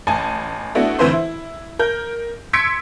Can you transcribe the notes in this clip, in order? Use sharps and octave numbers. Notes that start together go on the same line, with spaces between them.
A1 G#5 A5
A3 B3 D4 E4 F#4
D2 E3 C4 B4 C5 C6
E4
A#4 G6
C6 E6 G#6 B6 C#7 D7